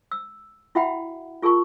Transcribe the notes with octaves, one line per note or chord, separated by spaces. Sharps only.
E6
E4 F#4 E5 F#5 G5 B5
F4 G#4 A#4 A5 C#6